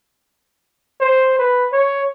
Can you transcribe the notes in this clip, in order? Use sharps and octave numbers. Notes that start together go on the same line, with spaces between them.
C5
B4
C#5